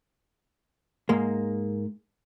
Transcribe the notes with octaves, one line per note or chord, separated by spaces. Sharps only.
G#2 G#3 A#3